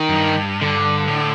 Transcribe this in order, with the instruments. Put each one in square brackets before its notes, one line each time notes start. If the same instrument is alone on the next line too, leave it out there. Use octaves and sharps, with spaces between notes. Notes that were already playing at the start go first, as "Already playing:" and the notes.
Already playing: [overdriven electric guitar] D#3
[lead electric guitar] F#2
G2
[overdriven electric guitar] D3
[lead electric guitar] A2